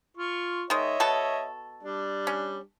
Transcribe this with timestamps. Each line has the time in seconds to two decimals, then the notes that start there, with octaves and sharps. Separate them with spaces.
0.17 F4 C#6
0.70 D#3 G#3 C#5 D#5 E5
1.00 B2 A4 C#6
1.83 G3 D4
2.27 C#4